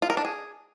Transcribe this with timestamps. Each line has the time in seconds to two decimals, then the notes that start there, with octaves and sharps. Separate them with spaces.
0.02 F4
0.10 A#4
0.17 D4
0.25 G#4